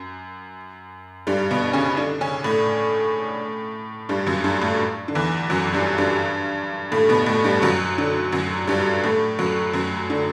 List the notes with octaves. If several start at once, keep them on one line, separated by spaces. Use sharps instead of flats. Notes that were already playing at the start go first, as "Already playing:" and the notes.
Already playing: F#2
G2 G3
B2 B3
C#3 C#4
D3 D4
C#3 C#4
A2 A3
G2 G3
F#2 F#3
G2 G3
A2 A3
D3
E2 E3
F#2 F#3
G2 G3
G2 G3
A2 A3
B2 B3
A2 A3
G2 G3
F#2 F#3
D3
F#2 F#3
G2 G3
A2 A3
F#2 F#3
F#2 F#3
D3